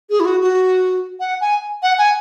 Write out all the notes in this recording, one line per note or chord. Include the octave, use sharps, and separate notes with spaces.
G#4
E4
F#4
F#4
F#5
G#5
F#5
G#5